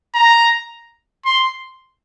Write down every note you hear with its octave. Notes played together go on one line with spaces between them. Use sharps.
A#5
C6